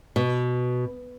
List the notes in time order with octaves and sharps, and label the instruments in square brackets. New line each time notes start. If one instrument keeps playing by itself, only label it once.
[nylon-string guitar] B2